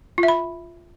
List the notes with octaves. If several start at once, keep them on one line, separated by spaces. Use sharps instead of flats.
F4
E5
B5